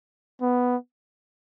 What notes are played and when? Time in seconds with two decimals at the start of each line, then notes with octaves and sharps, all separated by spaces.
0.41 B3